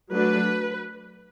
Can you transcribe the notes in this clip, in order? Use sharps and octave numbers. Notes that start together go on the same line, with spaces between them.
F#3 A3 D4 B4